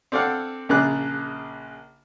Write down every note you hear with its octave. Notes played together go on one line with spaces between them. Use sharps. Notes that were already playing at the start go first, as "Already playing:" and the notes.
C4 D4 A4 D5 F5 F#5
A#1 C#3 A#3 G#4 D5 F#6